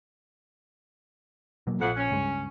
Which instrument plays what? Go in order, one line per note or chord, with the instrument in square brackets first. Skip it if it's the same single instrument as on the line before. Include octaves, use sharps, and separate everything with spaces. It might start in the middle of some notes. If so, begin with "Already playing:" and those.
[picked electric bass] B2 F#3 A#3
[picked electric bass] A#1 [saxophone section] F2 F#5
[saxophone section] C#4
[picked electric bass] C#2 G2 G#3